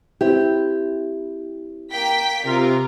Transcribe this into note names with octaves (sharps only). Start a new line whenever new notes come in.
C4 E4 G4
A#3 G5 B6
C3 F4 A#4